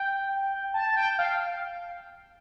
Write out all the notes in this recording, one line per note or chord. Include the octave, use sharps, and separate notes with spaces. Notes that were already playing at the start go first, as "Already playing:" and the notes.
Already playing: G5
A5
G5
F5